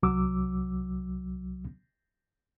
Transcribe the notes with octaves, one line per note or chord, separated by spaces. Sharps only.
C2 F#3 D6 E6